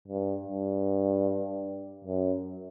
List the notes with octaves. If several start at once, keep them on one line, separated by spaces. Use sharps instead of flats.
G2
G2
F#2